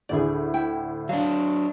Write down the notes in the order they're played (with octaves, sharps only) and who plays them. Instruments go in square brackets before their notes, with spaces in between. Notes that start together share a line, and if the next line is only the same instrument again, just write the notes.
[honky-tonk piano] D2 A2 D3 [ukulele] G#4 D5
[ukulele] E4 G5
[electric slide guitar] F#3 D4 [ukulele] F5